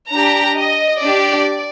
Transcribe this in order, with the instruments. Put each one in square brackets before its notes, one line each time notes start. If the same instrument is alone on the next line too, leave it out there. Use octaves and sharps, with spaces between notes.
[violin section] D4 G4 A#5
D#5
D4 G4 D5